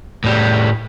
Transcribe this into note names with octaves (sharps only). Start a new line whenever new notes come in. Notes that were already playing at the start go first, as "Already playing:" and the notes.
A2 G3